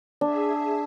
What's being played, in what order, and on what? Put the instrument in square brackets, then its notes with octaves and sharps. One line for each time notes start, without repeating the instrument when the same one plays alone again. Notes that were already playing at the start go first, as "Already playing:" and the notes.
[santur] D4 [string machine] G#4 E5